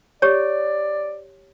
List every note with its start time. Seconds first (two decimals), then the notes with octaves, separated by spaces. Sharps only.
0.22 G4 C#5 D5